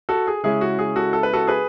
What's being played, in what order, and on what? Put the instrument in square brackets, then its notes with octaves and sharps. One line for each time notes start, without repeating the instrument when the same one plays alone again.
[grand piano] F#4 A4
G#4
C#3 G#3 C#4 E4 G#4
F#4
G#4
F#4 A4
A4
B4
F#4 A4
G#4 B4